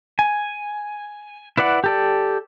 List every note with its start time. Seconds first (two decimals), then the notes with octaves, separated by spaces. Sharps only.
0.19 G#5
1.57 E4 B4 D5 F#5
1.84 G4 A4 D5